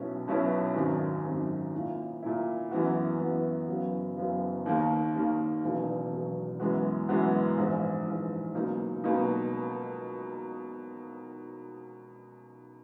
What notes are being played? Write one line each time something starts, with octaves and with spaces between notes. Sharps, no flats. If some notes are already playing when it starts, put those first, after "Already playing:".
Already playing: B1 B2 F#3 C#4 E4
B1 B2 F#3 C#4 E4
G#1 F#2 D#3 F#3
G#1 F#2 D#3 F#3
A#2 A#3 E4
A#2 A#3 E4
F#2 E3 B3 F#4
F#2 E3 B3 F#4
F#1 F#2 C#3 F#3 B3
F#1 F#2 C#3 F#3 B3
D#2 D#3 A#3
D#2 D#3 A#3
E1 E2 C#3 F#3
E1 E2 C#3 F#3
F#2 E3 G#3 B3 F#4
F#2 E3 G#3 B3 F#4
A#1 G#2 E3
A#1 G#2 E3
C#2 B2 F#3 A#3 D#4
C#2 B2 F#3 A#3 D#4